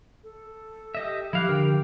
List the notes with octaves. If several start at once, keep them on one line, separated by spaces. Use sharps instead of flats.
A4
G4 D#5 E5
F3 E4 G4 F5 F#6
D3 A#4 G5